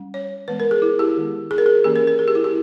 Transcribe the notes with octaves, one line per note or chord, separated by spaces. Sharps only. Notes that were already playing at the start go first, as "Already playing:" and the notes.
Already playing: G3 C#4
C#5
E3 G#3 B3 B4
A#4
G#4
E4
G4
D#3 G#3 B3
G#4
A#4
G#4
E3 A#3 C#4 G4
A#4
A#4
G#4
G4
E4
G4